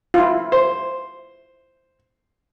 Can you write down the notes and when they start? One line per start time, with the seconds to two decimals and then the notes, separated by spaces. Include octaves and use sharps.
0.14 E4 F4
0.52 C5